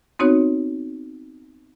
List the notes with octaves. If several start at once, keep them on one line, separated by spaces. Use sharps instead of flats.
B3 C4 D#4 F#4 C#5